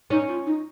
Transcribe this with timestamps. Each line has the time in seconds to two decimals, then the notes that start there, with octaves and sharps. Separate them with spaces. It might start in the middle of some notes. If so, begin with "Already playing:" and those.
0.10 C#4 D#4
0.28 F4
0.46 D#4